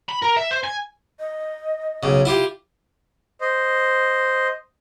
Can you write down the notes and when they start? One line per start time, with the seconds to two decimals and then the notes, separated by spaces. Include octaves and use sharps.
0.09 B5
0.22 A#4
0.37 E5
0.51 C5
0.64 G#5
1.20 D#5
2.03 B1 C#3
2.25 E4 F4 G4
3.41 C5 D#5